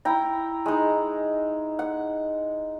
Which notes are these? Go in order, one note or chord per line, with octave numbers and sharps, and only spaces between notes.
E4 G5 A#5
G#3 D#4
F#5